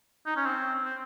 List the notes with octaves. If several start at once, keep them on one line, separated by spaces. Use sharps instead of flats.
D#4
C#4
C4
C4